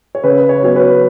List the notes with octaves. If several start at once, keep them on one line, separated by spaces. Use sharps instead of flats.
C#5
C#3 B4
C#5
F#3 B3 C#5
B4